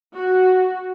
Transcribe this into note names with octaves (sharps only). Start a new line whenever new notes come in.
F#4